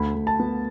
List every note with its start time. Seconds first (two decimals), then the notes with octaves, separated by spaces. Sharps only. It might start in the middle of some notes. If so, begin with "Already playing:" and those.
Already playing: D2 B5
0.15 D2
0.27 A5
0.40 B3